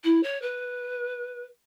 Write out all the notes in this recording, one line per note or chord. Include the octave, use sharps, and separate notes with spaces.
E4
C#5
B4